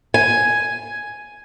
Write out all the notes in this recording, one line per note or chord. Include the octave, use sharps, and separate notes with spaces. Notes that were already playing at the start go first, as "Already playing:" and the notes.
G#5